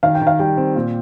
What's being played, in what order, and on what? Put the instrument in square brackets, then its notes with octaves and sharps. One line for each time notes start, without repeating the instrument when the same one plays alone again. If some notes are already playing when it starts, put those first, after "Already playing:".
[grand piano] D#3 [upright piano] F5
[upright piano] G5
[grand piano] D#3
[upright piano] F5
[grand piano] G3 [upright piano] G5
[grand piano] C4
A#2